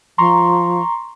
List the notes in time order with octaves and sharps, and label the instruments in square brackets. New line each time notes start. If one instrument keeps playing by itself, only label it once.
[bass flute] F3 [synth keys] A#5 C6 C#6